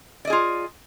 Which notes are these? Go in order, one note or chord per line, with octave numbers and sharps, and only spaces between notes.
F4 G#4 D5 D#5